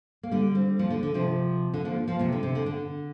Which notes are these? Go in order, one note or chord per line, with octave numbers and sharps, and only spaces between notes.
A#3
D3 G3
G3 C4
F3 A#3
D3
D3
C3 F3
D3
F3 A#3
F3 A#3
C3 F3
D3
C3
D3
D3